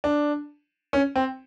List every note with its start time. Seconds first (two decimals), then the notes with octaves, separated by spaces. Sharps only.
0.04 D4
0.93 C#4
1.16 C4